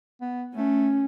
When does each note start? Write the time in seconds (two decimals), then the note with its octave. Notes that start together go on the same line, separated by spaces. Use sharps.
0.21 B3
0.55 A3 C#4